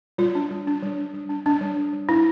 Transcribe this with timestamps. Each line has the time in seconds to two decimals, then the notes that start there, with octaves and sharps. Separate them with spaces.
0.18 G3 F4
0.35 D4
0.51 G3
0.67 D4
0.83 G3
0.98 D4
1.14 G3
1.29 D4
1.46 D4
1.61 G3
1.77 G3
1.93 G3
2.09 D4 E4